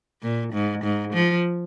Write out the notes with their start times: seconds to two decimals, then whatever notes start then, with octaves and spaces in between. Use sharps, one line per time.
0.22 A#2
0.53 G#2
0.83 G#2
1.13 F3